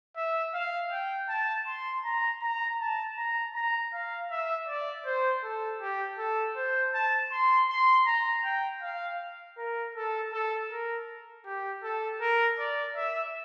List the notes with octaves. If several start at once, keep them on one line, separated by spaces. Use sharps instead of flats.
E5
F5
G5
A5
C6
A#5
A#5
A5
A#5
A#5
F5
E5
D5
C5
A4
G4
A4
C5
A5
C6
C6
A#5
G5
F5
A#4
A4
A4
A#4
G4
A4
A#4
D5
E5